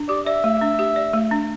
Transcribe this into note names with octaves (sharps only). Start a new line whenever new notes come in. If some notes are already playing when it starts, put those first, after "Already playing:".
Already playing: D4
G4 D5
D5 E5
A3
D4
G4
D5
A3
D4